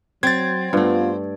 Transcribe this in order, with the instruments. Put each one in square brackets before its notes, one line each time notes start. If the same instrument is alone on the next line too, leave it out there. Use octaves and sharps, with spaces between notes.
[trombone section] F#3 [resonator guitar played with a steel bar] C4 [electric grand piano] G#6 A6
[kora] G2 A3 [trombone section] B3 F4